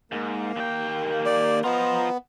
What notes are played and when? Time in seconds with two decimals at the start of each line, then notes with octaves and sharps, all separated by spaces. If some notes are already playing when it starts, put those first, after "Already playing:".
0.12 G#2 A#3
0.56 D#2 G5
1.26 D5
1.64 B3 F4 C5 D#5 A#5